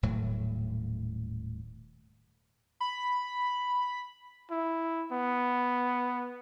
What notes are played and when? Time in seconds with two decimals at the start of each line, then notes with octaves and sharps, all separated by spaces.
0.03 D#1 A2 F#3
2.80 B5
4.51 E4
5.12 B3